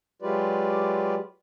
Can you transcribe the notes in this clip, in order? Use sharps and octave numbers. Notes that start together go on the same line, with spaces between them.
F#3 G#3 F4 G4 B4 D5